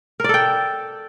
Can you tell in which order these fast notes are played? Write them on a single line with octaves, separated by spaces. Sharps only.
A#4 D5 A4 G5